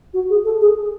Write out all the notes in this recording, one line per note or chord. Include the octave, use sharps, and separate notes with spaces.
F#4
G#4
A4
G#4